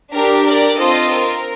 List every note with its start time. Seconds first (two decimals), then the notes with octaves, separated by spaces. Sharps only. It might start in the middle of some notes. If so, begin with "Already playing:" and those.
0.13 D4 G4 A#4
0.45 A#4 D5
0.77 C4 F4 A4 C5 D#5
1.10 A#4